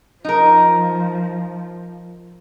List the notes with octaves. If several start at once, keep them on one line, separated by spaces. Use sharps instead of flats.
F3 D#4 A#4